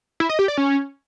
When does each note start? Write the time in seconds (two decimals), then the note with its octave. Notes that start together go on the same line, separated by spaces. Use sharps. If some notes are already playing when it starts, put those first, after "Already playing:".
0.20 E4
0.29 D#5
0.39 G4
0.48 D5
0.58 C#4